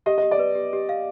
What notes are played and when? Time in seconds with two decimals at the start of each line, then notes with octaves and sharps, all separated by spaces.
0.06 G4 D#5
0.18 G4 D#5
0.31 D5
0.39 B4
0.55 G4
0.73 G4
0.89 F5